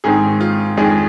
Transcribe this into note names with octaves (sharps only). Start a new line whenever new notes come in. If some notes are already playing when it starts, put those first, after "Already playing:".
G#2 D#3 C4 G#4
F4
F2 D#3 G#3 G#4